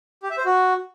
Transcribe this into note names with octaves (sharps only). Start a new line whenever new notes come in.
G4
E5
C5
F#4